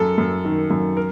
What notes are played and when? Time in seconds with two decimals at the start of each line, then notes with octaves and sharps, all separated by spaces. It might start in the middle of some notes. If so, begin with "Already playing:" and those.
Already playing: F#2 A4
0.18 F#2
0.45 D#3
0.70 F#2
0.97 A#4